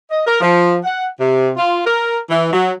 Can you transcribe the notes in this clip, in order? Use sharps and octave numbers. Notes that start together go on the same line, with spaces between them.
D#5
A#4
F3
F#5
C3
F4
A#4
E3
F#3